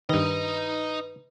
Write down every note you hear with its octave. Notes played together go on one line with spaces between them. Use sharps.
G2 D#3 D#4 B4 D#5